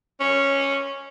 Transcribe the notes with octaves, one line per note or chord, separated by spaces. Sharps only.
C#4